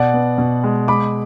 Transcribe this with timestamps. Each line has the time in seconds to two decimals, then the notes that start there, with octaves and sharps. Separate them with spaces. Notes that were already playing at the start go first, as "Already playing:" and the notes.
Already playing: B2 D5 F#5
0.14 B3
0.38 B2
0.64 G#3
0.88 G#3 B5 D6